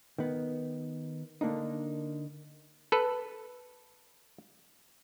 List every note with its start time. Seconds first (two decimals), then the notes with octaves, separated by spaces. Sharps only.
0.18 D#3 B3
1.41 D3 A#3 D4 D#4
2.92 A4 B4